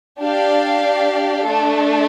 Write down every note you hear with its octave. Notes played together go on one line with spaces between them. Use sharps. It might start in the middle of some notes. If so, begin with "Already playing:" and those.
D4 G4 D5 F5
A3 D4 A4